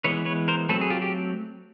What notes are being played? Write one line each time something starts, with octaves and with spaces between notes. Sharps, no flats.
E3 G#3 B3 B4 C#5
B4 C#5
A#4 C5
F#3 A3 C4 A4 B4
G#4
F4 G4
G4